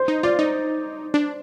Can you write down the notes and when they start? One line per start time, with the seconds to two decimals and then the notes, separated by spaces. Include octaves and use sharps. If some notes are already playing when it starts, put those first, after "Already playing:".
Already playing: C5
0.08 D#4
0.23 F4 D5
0.39 D#4
1.14 D4